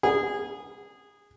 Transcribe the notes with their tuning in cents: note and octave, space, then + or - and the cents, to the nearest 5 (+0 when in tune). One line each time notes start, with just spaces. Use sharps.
G#4 -20